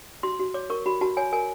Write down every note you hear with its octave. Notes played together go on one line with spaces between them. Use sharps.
F#4 C6
F#4
C#5 D6
A#4 C#6
F#4 B5
F#4 A5
C#5 G#5
A#4 G#5